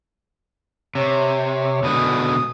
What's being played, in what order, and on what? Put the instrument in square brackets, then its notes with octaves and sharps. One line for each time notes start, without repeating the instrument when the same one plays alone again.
[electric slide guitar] C3 [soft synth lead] C#5
[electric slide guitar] B2 D3 G#3 [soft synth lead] D#6